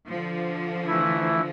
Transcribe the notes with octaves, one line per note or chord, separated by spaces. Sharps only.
D3 F3
E3 A3 E4